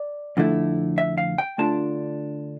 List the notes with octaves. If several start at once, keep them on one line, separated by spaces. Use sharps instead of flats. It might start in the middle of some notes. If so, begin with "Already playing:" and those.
Already playing: D5
F2 D3 A3 E4
E5
F5
G5
D3 A3 D4 F4 A5